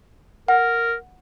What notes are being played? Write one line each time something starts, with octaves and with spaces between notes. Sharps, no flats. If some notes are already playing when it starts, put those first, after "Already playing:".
A#4 F#5